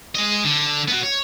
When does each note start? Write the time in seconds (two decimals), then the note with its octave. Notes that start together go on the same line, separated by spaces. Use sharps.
0.15 G#3 D#5
0.45 D3
0.88 B3 F#4
1.03 C#5